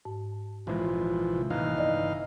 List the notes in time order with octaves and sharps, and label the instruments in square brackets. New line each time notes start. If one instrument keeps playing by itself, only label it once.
[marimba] G#2
[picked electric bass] A#1 C#3 G#3 [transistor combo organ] E3 F3
[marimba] C3
[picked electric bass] A1 D#2 [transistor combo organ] E3 D#4 F5
[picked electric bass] G1 [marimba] D5 D#5